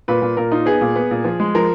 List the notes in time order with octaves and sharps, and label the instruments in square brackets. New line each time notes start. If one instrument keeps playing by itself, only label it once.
[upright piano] A#2 B4
A#2
A#2 A#4
D#4 F4
B3 G#4
A#2
B3
A#2
F3
G#3
F3 A#4